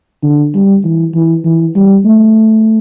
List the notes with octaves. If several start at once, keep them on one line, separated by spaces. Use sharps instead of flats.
D3
G3
E3
E3
E3
G3
A3